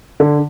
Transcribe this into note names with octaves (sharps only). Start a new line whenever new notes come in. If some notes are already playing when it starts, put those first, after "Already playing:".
D3